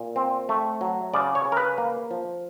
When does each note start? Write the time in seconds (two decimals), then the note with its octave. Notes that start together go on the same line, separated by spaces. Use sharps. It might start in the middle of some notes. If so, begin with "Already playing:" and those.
Already playing: A#2
0.16 C4
0.49 A3
0.81 F#3
1.14 C#3 D5
1.35 C#5
1.45 C#3
1.52 A#4
1.57 B4
1.78 A#3
2.11 F3